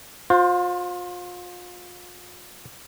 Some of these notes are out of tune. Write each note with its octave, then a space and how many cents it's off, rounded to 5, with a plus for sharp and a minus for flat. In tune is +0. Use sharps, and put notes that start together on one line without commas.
F4 +35 C5 +5